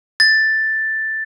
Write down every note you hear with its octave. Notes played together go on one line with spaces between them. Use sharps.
A6